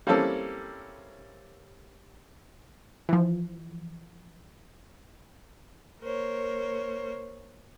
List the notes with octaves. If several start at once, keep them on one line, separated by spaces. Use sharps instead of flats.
G3 A#3 C4 C#4 E4 A4
E3 F3
A#3 A#4 C5 C#5